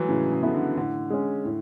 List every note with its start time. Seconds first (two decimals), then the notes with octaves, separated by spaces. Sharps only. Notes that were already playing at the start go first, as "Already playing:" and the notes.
Already playing: E3 F#3 G#3 A3
0.08 A2 C#3
0.32 C#3
0.42 E3 B3 E4 A4
0.54 D3
0.77 A2 D3
1.10 G#3 C#4
1.45 A2